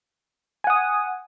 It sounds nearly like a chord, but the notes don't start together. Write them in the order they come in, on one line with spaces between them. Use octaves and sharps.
G#5 F#5 D#6